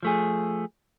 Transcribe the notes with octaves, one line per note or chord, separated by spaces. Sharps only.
F3 A3 G#4